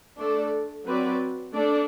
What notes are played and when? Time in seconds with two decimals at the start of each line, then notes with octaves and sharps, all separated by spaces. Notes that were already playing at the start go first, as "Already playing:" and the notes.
0.17 A3 D4 A4 D5
0.85 F#3 C4 F#4 B4 D5
1.52 A3 D4 A4 D5